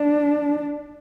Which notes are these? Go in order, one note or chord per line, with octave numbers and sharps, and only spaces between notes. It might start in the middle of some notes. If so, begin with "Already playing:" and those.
Already playing: D4